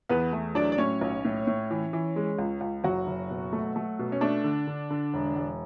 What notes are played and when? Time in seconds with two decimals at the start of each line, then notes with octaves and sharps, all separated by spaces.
0.09 E2 B3 B4
0.33 A3
0.55 F#3 D4 D5
0.72 D5
0.78 A2 C#4 C#5
1.01 B1
1.25 A2
1.47 A2
1.70 E3
1.93 E3
2.16 G#3
2.39 C#2
2.61 C#2
2.84 F#1 F#3 F#4
3.07 F#1
3.30 B2
3.53 A3
3.76 A3
3.99 B2
4.12 C#4
4.21 A3 D4
4.44 D3
4.67 D3
4.90 D3
5.14 E1
5.36 E1